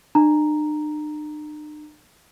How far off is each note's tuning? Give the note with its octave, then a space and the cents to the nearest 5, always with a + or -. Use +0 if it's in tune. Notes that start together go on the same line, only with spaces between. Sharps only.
D4 +45 A#5 -5